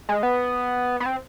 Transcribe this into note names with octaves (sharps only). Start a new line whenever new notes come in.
G#3
B3
B3
C4